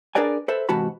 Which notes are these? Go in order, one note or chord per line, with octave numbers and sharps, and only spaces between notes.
D4 G#4 A#4 B4 D5 G#5
A4 B4 C5 E5
G#2 C3 E3 F#4 A5 B5